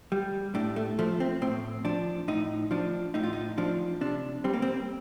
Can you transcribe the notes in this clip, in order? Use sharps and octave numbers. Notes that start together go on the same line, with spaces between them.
G3
A2 D4
A3
F3 A3
C4
A2 C4
F3 D4
A2 D#4
F3 D4
A2 D#4
F4
D#4
F3 D4
C3 D4
G3 C4
A#3
C4